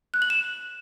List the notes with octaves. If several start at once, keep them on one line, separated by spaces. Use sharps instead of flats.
F#6
F#7
E7